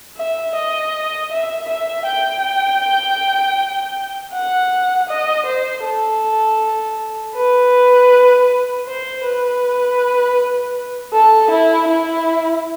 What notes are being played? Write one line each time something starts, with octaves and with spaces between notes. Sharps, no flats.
E5
D#5
E5
E5
G5
F#5
D#5
C5
A4
B4
C5
B4
A4
E4
E4